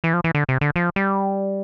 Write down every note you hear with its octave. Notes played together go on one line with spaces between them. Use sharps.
E3
F3
E3
D3
C3
D3
F3
G3